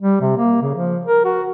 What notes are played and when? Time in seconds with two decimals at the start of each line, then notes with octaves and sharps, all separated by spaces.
0.03 G3
0.22 C3
0.38 A#3
0.62 C#3
0.76 F3
1.06 A#4
1.25 F#4